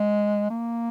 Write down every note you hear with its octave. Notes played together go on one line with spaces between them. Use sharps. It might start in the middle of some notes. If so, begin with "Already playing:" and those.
Already playing: G#3
A#3